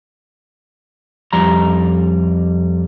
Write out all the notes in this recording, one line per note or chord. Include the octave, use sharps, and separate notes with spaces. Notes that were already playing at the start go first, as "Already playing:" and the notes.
F2 G3 A#5